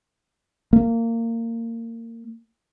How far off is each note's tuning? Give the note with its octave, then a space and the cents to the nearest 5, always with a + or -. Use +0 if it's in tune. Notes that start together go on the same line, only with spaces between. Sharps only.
A#3 -25